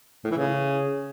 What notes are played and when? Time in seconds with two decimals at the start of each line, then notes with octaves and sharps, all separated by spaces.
0.24 A2
0.31 E3
0.37 C#3